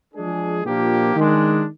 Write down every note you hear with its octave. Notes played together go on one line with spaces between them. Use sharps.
F3 G#3 D4 G#4
A#2 F3 A#3 D4 G4
D#3 G#3 D4